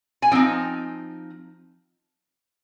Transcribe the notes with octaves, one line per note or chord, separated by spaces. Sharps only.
G#5
F3 C4 D#4 G5